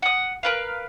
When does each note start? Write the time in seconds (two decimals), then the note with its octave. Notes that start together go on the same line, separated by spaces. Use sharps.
0.02 F#5 D#6
0.43 A#4 B4 F5